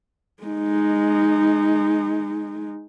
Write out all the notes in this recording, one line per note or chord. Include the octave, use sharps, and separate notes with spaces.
G#3 D#4